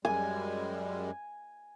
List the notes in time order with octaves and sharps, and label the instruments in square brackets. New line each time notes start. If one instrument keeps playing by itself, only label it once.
[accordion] F#2 G3 G#3 [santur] G#5